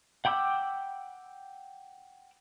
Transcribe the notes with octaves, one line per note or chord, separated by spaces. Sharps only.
F#5 G5 B5 D6 E6